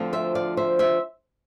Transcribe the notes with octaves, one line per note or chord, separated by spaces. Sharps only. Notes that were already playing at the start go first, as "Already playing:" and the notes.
Already playing: D2 D3 F3 C4 F4
C5 E5
D5 F5
C5 E5
C5 E5